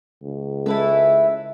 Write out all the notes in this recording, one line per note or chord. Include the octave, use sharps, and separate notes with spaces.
C#2
G#3 C#4 E4 A4 B4 E5